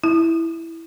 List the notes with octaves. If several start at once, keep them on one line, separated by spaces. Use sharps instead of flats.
E4